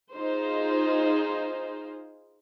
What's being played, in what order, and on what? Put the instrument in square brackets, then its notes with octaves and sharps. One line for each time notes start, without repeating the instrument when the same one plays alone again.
[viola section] D#4 F4 G#4 C5